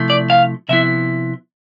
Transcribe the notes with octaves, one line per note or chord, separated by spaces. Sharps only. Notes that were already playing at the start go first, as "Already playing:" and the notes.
Already playing: C3 F3 A3 E4
D5
F5
C3 F3 B3 E4 E5